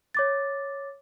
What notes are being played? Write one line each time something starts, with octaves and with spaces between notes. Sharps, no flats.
C#5 D6 A6